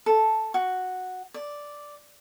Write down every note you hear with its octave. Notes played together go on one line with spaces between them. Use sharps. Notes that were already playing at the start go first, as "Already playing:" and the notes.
A4
F#4
D5